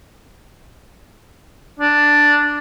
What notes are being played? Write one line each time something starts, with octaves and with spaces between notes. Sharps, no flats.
D4